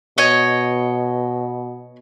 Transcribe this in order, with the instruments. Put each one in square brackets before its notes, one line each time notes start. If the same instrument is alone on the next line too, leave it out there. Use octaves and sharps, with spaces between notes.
[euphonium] B2 [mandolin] C#5 D#5